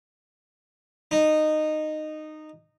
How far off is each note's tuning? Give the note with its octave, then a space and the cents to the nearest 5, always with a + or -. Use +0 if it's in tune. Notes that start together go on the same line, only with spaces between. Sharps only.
D#4 -15